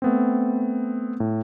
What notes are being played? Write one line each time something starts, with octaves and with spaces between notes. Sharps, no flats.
A3 B3 C4
A2